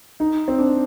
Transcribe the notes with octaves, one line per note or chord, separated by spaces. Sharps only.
D#4
C4
D4